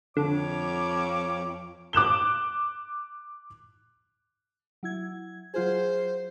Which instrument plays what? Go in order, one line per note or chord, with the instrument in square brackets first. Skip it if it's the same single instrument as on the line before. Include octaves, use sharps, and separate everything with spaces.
[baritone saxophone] F2 [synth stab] D3 [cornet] C#5 [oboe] D6
[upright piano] D6 F#6 E7 G7
[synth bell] F#3 E4 G#6
[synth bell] F#3 F4 G#4 [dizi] C5